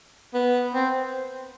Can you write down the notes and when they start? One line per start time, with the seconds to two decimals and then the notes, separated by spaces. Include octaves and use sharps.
0.34 B3
0.74 C4